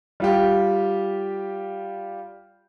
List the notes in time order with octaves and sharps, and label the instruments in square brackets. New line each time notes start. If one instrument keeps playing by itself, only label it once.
[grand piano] G3 F4 G4